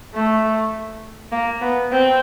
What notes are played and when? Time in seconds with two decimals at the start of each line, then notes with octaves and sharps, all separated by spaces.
0.14 A3
1.32 A#3
1.61 B3
1.91 C4